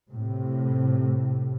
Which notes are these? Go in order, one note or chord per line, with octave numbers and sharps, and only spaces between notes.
A2 C3